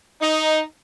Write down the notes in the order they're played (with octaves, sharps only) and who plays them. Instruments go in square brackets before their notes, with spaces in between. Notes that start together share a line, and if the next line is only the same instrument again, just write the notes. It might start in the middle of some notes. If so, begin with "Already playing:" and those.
[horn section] D#4